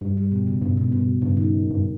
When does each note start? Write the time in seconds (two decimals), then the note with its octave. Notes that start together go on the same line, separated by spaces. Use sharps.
0.01 G2 G3
0.17 G3
0.32 B2
0.47 C#3
0.62 G2 B2
0.77 B2
0.84 G#2
0.92 G2 B2
1.22 G2 C#3
1.37 D#3
1.71 G2